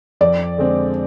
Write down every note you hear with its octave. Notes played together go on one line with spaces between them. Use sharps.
F2 D5
D3 G#3 C4